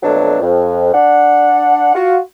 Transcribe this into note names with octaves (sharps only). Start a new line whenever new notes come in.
F2 B2 F#3 A3 D4
F2
D4 F#5
F4 F#4